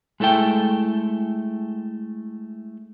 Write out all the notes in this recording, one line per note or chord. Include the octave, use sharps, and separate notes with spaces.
G#3 A3 E4 A4 G5